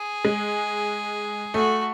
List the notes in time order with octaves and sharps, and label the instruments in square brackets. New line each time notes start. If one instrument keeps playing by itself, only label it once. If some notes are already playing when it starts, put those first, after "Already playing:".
Already playing: [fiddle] G#4
[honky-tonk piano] G#3
[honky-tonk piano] A3 [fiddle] F#4